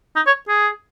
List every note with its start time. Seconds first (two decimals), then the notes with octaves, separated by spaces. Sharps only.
0.16 D#4
0.27 C#5
0.48 G#4